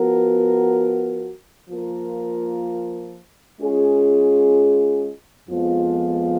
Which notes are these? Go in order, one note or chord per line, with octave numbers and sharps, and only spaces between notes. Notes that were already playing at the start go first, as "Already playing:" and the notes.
Already playing: F3 B3 F#4 A#4
F3 A#3 F4 A#4
G#3 C#4 F4 G#4
F2 F3 G#3 B3 F4